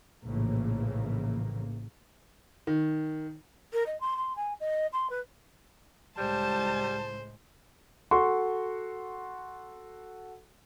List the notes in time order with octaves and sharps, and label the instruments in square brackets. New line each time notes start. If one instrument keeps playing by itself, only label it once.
[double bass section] A#1 A2 C#3 E3 A#3
[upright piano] D#3
[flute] A#4
D#5
C6
C6
G#5
D#5
C6
B4
[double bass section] C#2 A2 G#3 [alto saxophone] G3 [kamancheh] C5 [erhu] A5
[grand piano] F#4 A4 C6 C#6